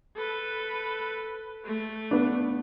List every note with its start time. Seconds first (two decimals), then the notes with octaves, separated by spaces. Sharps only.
0.16 A4 B4
1.65 A3
2.11 B3 D4